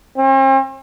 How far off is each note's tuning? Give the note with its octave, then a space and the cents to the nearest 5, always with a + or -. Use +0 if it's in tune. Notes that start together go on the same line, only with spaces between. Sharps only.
C4 +45